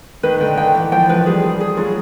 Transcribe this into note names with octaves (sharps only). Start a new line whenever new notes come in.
D#3 B4
D#3
D3 G5
D#3 G5
E3 B4
F3 G5
F3 B4
G3 G#4
G#4
G3
G#4
F#3 F4